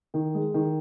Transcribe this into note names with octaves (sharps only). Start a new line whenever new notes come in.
D#3
G#3
D#3